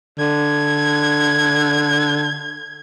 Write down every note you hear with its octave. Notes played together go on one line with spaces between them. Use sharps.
D3 G#6